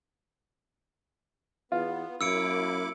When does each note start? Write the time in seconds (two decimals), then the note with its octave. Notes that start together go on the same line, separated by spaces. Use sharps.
1.72 E2 B3 F4
2.21 F#2 A#3 E4 D6 E6 C#7 D7